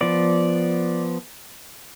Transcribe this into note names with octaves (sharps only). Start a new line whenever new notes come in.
F3 B3 D5